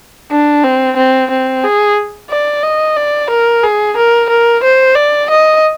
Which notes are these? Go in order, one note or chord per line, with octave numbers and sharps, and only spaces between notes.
D4
C4
C4
C4
G#4
D5
D#5
D5
A#4
G#4
A#4
A#4
C5
D5
D#5